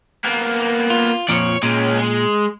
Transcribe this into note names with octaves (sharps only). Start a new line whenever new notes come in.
A#3 B3
F4
F2 A#2 F3 C#5 D5
A#2 G#3 C#4
G#3